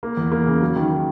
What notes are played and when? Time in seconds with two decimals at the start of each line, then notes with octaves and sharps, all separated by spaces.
0.03 A#3
0.17 E2
0.32 A#3
0.46 C#3
0.61 F#3
0.76 D#3
0.90 D#3